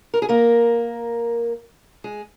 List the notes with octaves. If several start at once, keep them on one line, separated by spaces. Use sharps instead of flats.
A#4
G#4
A#3 A#4
G#3 G#4